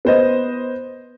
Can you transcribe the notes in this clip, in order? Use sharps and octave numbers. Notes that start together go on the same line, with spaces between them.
B3 C5 D#5